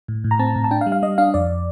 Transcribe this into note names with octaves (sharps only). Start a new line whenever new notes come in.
A2
A2
A#5
C4 A5
A2
A5
D4 G5
F5
G3
F5
G3 D#5
D4 F5
F2 D5